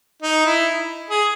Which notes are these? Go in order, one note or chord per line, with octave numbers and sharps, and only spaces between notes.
D#4
E4
G#4